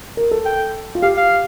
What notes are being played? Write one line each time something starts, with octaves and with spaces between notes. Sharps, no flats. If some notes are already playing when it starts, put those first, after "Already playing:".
A#4
A4
G5
F4
G4 F5
F5